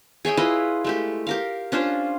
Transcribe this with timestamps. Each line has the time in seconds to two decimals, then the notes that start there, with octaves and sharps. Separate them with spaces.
0.25 G#4 C#5 E5 G5
0.37 E4 F4 B4 D#5
0.84 G#3 A3 G4
1.27 G4 A#4 F5
1.72 C#4 D4 F4 C5